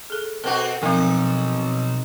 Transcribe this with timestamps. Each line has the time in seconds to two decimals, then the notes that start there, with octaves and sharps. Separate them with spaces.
0.10 G#4 A4
0.44 B2 C4 F#4 A4 A#4
0.83 B1 F3 C4 D#4